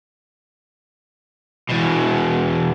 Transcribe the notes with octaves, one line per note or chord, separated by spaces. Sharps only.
E2 B2